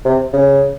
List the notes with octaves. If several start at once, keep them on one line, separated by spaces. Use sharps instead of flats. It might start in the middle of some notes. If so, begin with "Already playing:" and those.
C3
C#3